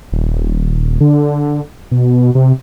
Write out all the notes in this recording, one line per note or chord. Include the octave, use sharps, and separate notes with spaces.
D#1
D3
B2
C3